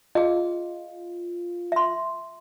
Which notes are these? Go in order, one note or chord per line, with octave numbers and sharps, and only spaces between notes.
F4 G#4 D#5
E5 C6